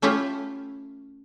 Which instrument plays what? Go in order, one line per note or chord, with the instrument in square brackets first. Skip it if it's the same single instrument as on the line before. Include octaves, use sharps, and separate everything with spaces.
[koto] A3 C#4 E4 F4 G4